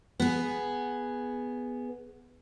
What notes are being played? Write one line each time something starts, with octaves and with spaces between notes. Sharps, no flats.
B3 G#4